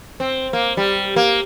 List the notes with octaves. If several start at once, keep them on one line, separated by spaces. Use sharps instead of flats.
C4
A#3
G3
A#3